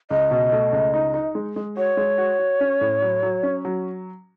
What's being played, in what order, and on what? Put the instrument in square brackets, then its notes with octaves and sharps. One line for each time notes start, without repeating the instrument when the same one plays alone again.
[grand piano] C#2 [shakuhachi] D#5
[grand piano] B2
A3
C#2
D#4
D#4
G#3
G#3
[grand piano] F#4 [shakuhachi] C#5
[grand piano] G#3
F#4
F#4
C#4
A2
F#3
F#3
C#4
F#3